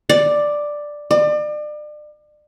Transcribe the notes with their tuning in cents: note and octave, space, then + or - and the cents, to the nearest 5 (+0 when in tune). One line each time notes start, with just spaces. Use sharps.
D5 +5
D5 +35